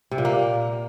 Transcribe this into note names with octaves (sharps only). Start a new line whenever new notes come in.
C3
A#2
A#3